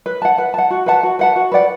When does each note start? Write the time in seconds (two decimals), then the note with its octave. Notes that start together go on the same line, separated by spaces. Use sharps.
0.06 B4
0.22 F#5 A5
0.38 B4
0.54 F#5 A5
0.70 F#4
0.86 B4 F#5 A5
1.03 F#4
1.19 B4 F#5 A5
1.36 F#4
1.52 B4 D5 F#5